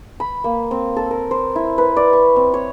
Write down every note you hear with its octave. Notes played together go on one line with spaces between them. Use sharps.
B5
A#3
C4
A4
A#4
C5
E4
B4
D5
C#6
C4
C#5